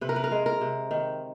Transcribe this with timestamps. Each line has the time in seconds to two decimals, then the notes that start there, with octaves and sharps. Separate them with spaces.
0.01 C3 B4
0.09 A#4
0.16 B4
0.24 A#4
0.31 G#3
0.46 A#4
0.61 C3
0.91 D#3